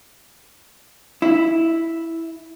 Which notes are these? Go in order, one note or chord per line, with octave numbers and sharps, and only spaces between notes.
E4